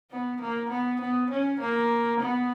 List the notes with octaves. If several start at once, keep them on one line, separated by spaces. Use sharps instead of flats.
B3
A#3
B3
B3
C#4
A#3
B3